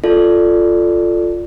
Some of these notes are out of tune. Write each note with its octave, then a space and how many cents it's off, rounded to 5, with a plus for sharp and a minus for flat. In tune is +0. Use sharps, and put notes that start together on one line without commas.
F4 +0 A4 +0 D5 +0